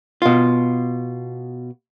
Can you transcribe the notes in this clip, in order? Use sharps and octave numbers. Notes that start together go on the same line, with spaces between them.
B2 F4